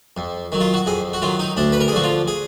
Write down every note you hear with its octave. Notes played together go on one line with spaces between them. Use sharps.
F2
D#3 F#3
F4
F#4
F2 G#4
F#4
D#3 F#3 F4
D#4
D2 D4
B4
A#4
G#4
D3 F3 F#4
F4
G#4